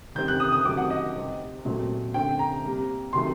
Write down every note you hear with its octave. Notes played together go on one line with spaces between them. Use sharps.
D#3 G3 C4 G6
F#6
D#6
D#6
C3 D#3 F#3 A3 C4 D6
F#5
D#5
C3 G3 C4
A#2 F#3 A3 C4
D3 A3 C4 G5
A#5
C3 G3 A#3
C3 D#3 F#3 A3 C6